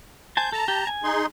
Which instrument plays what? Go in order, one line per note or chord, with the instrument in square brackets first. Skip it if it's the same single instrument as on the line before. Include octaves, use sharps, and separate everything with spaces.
[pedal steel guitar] C5 G#5 A5 [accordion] G6
[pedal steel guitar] A4 [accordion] A5 A#5
[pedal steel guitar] G4
G#5
[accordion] D#4 G#4 C6